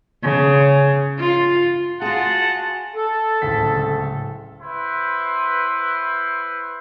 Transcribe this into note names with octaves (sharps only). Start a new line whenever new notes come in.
C#3
F4
F4 F#4 G#4 F#5 A5
A4
D1 C#2 B6
E4 B4 C5 C6